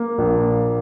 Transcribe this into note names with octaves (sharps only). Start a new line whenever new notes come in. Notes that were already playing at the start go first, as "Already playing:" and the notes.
Already playing: A#3
A#1